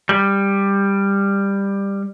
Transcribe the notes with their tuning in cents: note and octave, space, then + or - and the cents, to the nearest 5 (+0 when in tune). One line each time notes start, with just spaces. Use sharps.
G3 +15